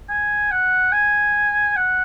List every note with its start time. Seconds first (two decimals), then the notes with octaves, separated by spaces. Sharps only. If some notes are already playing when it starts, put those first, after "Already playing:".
0.09 G#5
0.51 F#5
0.92 G#5
1.76 F#5